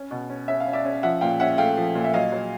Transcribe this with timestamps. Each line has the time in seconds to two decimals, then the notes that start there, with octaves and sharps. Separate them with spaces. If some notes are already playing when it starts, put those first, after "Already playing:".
Already playing: C#4
0.11 B2
0.30 C#4
0.48 C#4 E5
0.60 F5
0.67 C#4
0.73 D5 E5
0.85 C#4
1.03 F3 E5 F#5
1.21 A#2 F5 G5
1.40 C#4 E5 F#5
1.58 A3 F5 G5
1.77 F3
1.95 A#2
2.04 E5
2.14 F#3 D#5 F5
2.32 F#3